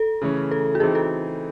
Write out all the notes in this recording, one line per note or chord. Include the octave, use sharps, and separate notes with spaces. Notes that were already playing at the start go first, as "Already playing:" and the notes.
Already playing: A4
C#3 E3 A3 C#4
A4
F#4
E3 C4 D#4 G#4
A4